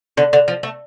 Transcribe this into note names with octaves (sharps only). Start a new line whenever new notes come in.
D3
D3
F3
A3